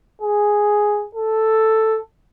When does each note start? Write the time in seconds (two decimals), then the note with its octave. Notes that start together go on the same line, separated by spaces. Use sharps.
0.21 G#4
1.15 A4